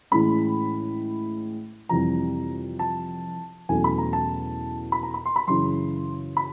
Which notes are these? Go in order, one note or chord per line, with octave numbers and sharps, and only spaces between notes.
A2 E3 G#3 C#4 B5
F2 C3 E3 G3 A#5
A5
E2 B2 F#3 A3 C#4 G#5
B5
A#5
A5
B5
A#5
B5
C6
B5
F#2 C#3 E3 C6
B5